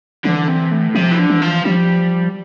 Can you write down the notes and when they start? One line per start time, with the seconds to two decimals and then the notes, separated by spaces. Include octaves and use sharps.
0.25 D3 E3
0.48 C3
0.71 A2
0.95 C3 F3
1.11 E3
1.18 D3
1.30 E3
1.42 F3
1.65 F3 G3